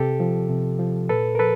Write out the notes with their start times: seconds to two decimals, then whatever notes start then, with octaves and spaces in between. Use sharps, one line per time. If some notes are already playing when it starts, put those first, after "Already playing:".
Already playing: C3 G4 A4
0.20 F3
0.49 C3
0.79 F3
1.09 A#2 A4 B4
1.35 A#4
1.39 F3 A4 B4